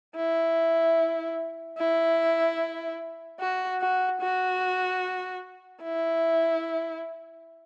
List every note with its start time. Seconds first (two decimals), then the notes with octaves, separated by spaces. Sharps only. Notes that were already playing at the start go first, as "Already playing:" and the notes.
0.16 E4
1.78 E4
3.40 F#4
3.80 F#4
4.21 F#4
5.83 E4